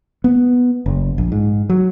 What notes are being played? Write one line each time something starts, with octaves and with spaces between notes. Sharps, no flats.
B3
F#1
A#1
G#2
F#3